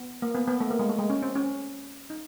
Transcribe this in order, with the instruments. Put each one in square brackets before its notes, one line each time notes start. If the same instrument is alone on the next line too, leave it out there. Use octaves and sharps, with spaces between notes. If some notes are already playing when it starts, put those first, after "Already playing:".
Already playing: [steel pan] B3
A#3
B3
B3
A3
A#3
G#3
A3
G#3
C#4
C4
C#4
D#4